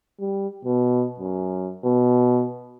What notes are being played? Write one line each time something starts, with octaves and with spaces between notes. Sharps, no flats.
G3
B2
F#2
B2